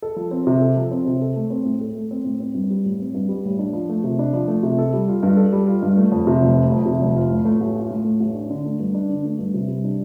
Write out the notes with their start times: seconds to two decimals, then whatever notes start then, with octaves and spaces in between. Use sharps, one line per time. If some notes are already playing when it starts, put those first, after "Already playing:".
0.02 A4
0.16 F3
0.31 C4
0.47 C3
0.62 A4
0.77 F3
0.91 C4
1.06 C3
1.22 A4
1.36 A3
1.50 C4
1.65 A2
1.81 A4
1.95 A3
2.11 C4
2.25 A2
2.40 C4
2.54 G2
2.70 G3
2.85 A1
3.00 C4
3.14 G2
3.29 G3
3.45 A1
3.59 D4
3.73 F3
3.89 A3
4.04 C3
4.19 D4
4.33 F3
4.48 A3
4.63 C3
4.78 A4
4.93 G3
5.08 F4
5.23 G2
5.37 A4
5.53 G3
5.67 F4
5.82 G2
5.97 A3
6.12 F2
6.27 C3
6.42 F1
6.57 A3
6.72 F2
6.86 C3
7.01 F1
7.16 F4
7.31 A2
7.45 A3
7.60 A1
7.76 F4
7.91 A2
8.05 A3
8.20 A1
8.34 D4
8.50 D3
8.65 A3
8.79 G2
8.94 D4
9.09 D3
9.25 A3
9.39 G2
9.54 C3
9.68 G3
9.84 D4